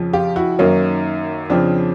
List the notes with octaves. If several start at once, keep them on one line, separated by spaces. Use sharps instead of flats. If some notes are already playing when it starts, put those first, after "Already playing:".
Already playing: F2 C#3 F3
F4 G4
E4 F#4
F#2 D#3 F#3 A#3 C#4 D#4
F2 C#3 F3 C4 D4